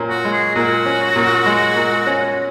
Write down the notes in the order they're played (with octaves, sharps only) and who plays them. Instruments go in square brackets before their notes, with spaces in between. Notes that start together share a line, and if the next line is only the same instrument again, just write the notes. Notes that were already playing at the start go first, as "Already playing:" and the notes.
Already playing: [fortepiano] A#2 C#4
[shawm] F#4
[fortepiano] G#3
[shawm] G#4
[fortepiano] A#2 [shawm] F#4
[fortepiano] C#4
A#2
G#3
A#2
C#4